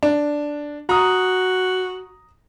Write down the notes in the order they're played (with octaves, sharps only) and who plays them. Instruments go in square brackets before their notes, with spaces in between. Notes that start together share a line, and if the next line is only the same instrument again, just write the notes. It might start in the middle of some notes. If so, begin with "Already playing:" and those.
[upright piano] D4
[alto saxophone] F#4 [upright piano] A#5 D#6